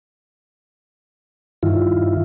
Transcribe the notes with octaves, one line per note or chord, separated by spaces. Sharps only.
G2 D#3 E4 F4